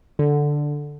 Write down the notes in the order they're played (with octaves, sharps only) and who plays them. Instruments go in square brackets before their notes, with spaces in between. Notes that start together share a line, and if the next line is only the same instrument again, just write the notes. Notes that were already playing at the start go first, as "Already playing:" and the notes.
[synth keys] D3